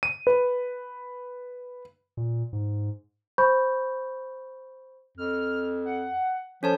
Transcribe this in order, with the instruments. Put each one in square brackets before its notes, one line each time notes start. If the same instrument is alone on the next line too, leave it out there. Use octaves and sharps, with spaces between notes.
[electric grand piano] D#7
B4
[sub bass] A#2
G#2
[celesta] C5 B5 C#6 G6
[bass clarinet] F2 [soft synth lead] F6
[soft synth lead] F#5
[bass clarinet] F3 [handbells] C#4 C#5 A5 [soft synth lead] A4